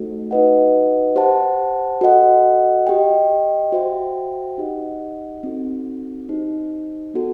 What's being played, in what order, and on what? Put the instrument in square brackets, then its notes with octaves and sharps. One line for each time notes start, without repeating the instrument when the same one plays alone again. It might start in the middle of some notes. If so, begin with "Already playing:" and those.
Already playing: [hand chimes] A3 D#4 F#4 A4 C5
D#4 F#4 B4 D#5 F#5
G4 C5 F#5 A5
F#4 A4 D#5 F#5
G4 D#5 G5
F#4 C5 E5 G5
D#4 G4 D#5 F#5
C4 D#4 F#4 A4
D#4 G4 C5
B3 F#4 A4